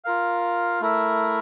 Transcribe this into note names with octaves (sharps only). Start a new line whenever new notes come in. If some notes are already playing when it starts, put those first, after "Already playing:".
F4 A#4 F5
A3 E4 A#4 E5